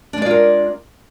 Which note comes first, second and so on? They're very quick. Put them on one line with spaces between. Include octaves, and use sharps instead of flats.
D4 G#3 D5 F4 A#4